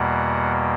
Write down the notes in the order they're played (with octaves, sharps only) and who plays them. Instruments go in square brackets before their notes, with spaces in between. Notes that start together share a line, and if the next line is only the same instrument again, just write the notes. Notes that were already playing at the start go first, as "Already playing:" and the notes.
Already playing: [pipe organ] E2 B2 G3 A#3 F#5